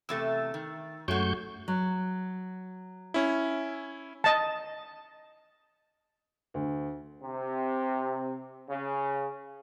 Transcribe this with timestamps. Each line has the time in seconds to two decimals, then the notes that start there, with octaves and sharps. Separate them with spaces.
0.09 E2 C3 A3 E6 A6
0.54 D#3
1.08 F#2 F#3 G#3 A3 F#4 C#6 G6
1.68 F#3
3.14 C#4 E4
4.24 D#5 A5
6.54 D2
7.22 C3
8.69 C#3